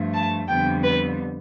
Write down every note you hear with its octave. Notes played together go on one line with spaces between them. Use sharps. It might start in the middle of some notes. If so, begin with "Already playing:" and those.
Already playing: G2 F3 A3
A5
F2 D3 G3 B3 G5
B4